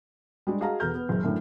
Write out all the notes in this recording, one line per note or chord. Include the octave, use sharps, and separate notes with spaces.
G3 G#3 D4
F#4 G#4 D#5 F5 A5 A#5
E1 B3 A4 A#5 F6 G6
B3
F#1
F#2 A2 D3 A3